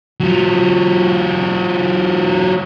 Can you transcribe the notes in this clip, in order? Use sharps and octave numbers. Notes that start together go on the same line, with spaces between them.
F#3 F4